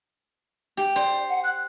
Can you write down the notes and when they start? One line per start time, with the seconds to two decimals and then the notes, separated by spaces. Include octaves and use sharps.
0.77 G4
0.96 C5 D5
1.29 F#5
1.44 F#6